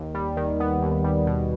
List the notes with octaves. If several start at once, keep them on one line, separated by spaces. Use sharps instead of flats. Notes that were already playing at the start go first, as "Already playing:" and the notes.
Already playing: D#2
G3
D#3
B3
D#2
G3
B2